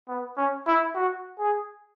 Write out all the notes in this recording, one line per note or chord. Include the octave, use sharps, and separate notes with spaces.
B3
C#4
E4
F#4
G#4